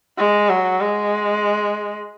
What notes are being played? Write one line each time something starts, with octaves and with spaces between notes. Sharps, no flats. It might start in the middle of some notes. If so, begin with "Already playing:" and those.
G#3
F#3
G#3